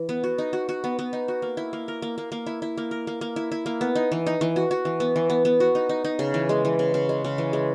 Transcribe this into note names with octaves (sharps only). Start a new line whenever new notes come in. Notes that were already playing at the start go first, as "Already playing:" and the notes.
Already playing: E3
B3
F#4
D#4
F#4
F#4
B3
B3
D#4
F#4
A#3
E4
A#3
A#4
A#3
A#3
A#3
E4
E4
A#3
A#4
A#3
A#3
E4
E4
A#3
B3
D#4
E3
D#4
E3
F#4
F#4
E3
B3
E3
B3
B3
F#4
D#4
D#4
D#4
C#3
E3
G#3
E3
C#3
C#3
G#3
C#3
E3
G#3